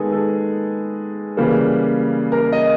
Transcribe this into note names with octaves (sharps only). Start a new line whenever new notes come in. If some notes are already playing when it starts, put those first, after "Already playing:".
Already playing: D#3 G#3 B3 G#4 A4
A4
C#3 E3 G3 A#3
A#4
D#5